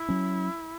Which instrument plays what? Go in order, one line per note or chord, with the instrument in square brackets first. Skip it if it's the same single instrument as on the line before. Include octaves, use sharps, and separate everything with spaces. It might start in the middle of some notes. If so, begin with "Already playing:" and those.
Already playing: [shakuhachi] E4
[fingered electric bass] F#3 C#4